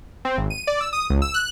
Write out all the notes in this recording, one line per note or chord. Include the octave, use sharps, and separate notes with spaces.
C4
G#1
D#7
D5
E6
D#6
C#2
E6
F#6